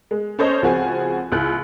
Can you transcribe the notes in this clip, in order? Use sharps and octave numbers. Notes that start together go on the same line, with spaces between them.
G#3
C#4 A4 C5 C#5 D#5
C#2 F3 C4 F#4 G#4 G#5
C#2 E4 F#6